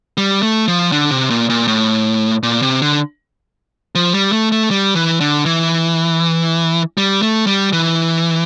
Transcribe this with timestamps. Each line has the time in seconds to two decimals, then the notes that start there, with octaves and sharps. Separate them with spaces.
0.17 G3
0.43 A3
0.68 F3
0.92 D3
1.11 C3
1.30 A#2
1.50 A#2
1.67 A2
2.43 A#2
2.62 C3
2.82 D3
3.95 F3
4.14 G3
4.32 A3
4.52 A3
4.71 G3
4.95 E3
5.20 D3
5.46 E3
6.97 G3
7.22 A3
7.47 G3
7.73 E3